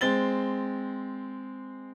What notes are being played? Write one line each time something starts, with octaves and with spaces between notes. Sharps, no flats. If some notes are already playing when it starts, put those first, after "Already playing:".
G#3 C4 A6 G7